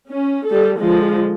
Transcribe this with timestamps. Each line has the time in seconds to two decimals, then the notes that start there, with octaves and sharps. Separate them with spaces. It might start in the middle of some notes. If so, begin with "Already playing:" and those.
0.11 C#4
0.46 G3 A4
0.79 D3 F3 G#3